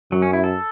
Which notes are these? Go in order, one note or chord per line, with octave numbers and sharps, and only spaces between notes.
F#2 F#3
C#4
E4
A4